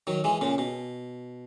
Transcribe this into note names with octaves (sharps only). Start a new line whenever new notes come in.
D#3 F#3
E3 G#3
A#2 C#3
B2